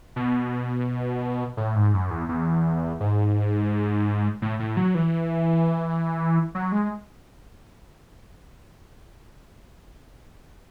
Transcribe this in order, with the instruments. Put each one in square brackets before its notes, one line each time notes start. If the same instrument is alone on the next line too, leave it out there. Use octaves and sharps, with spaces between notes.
[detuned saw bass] B2
A2
G#2
F#2
E2
E2
G#2
A2
A2
F#3
E3
F#3
G#3